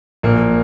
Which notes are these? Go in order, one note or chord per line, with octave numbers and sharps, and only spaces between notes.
A#1 A#3